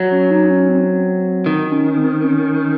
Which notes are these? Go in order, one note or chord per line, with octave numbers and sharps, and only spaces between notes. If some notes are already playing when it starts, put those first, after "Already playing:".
Already playing: F#3
C#4
D#4
C#4
C4
D#3 D#4
C#4
C4
C#4